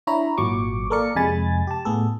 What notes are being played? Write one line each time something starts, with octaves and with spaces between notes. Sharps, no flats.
D4 E4 C#5 A#5 B5
G#1 A#2 F#3 C#6 D6
A#3 A4 A#4 D5 C#7
F2 C3 G#3 G#5 B5 A6
G4 A5
A2 A3 B3 G#4 A4